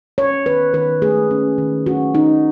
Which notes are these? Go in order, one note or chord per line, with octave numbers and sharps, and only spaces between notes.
C#4 C#5
D#3 B4
D#3 B4
A3 G#4
C#4
D#3
C#4 F#4
D#3 D#4